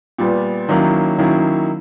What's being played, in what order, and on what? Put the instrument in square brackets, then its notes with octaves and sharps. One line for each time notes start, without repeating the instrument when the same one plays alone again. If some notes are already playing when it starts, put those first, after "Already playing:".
[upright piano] A#2 G3 B3
D#3 F#3 A#3 C#4 E4
D#3 F#3 A#3 C#4 E4